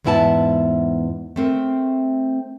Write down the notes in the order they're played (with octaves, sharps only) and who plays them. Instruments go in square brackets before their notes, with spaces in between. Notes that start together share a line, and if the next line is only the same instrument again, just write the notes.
[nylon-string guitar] E2 G#2 B3 E4 G5 A5
A3 C4 A#4